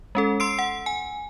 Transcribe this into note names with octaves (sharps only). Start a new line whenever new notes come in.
G#3 C#4 A4
C6 E6 C7 D7
F#5
G#5